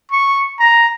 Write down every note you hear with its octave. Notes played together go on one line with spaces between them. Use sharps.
C#6
A#5